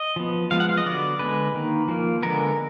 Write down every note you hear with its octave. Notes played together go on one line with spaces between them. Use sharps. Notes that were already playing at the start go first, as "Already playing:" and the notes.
Already playing: D#5
F3 B3
F3 G#3 B3 F5
F#5
F5
D#5
D3 F#3 B3 D5
D3 G#3 B3 B4
D#3 A#3
F3 A#3
D3 G#3 B3 A#4